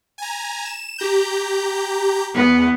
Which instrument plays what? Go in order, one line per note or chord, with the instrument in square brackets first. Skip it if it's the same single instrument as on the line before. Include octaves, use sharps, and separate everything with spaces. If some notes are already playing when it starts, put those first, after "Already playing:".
[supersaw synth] G#5 A#5
E7
G4 A#5 G6
[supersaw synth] E2 [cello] B3